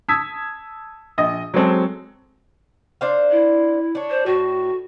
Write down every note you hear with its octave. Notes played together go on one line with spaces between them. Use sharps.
A5 D#6 E6 G#6 B6
A#1 D#5
F#3 G#3 C4 A4
D4 C5 F5
E4
D4 C#5
C5
A2 F#4